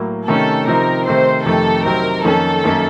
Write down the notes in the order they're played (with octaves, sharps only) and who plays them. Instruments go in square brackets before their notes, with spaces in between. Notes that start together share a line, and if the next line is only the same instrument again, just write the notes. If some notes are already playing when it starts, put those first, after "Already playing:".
Already playing: [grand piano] A2 F#3 A#3
[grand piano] C3 D#3 A3 C#4 [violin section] A4
[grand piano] C3 F3 C4 D#4 [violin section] A#4
[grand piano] C3 D#3 A3 C4 [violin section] C5
[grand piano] F2 C3 D#3 A3 [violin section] A4
[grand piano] C3 F#3 C4 D#4 [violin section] A#4
[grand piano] F2 D#3 A#3 C#4 [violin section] A4
[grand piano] F#2 D#3 A#3 C#4